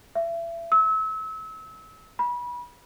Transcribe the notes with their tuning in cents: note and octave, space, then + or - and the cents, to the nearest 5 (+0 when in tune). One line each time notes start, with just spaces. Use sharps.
E5 +30
E6 -30
B5 -25